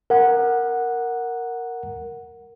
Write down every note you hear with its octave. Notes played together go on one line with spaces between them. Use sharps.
A#4 F#5